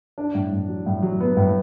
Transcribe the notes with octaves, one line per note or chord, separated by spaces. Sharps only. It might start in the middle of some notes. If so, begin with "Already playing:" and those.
D4
A2
A2
F#3
A2
F#3
B3
A2